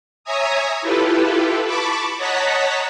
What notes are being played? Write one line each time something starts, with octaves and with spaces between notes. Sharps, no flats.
C#5 E5 G#5 A#5 D#6
E4 F4 G4 A4 B4
A5 B5 C#6 D6
C#5 D#5 F#5 A5 A#5 B6